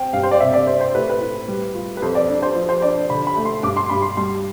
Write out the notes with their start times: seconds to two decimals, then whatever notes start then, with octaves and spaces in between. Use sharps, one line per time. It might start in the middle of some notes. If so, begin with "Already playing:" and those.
Already playing: C4 G5
0.13 G2 F5
0.23 C5
0.31 D5
0.40 C3 E5
0.54 D5
0.67 C4 C5
0.81 C5
0.94 A2 B4
1.10 B4
1.21 A2
1.48 G3
1.75 F4
1.97 B4
2.02 F2 C5
2.15 D5
2.29 D4
2.43 C5
2.55 F3
2.69 C5
2.82 D4 D5
3.10 D3 B5
3.27 B5
3.37 A3
3.45 C6
3.63 G2 D6
3.77 C6
3.89 G2 B5
4.02 C6
4.17 G3 C6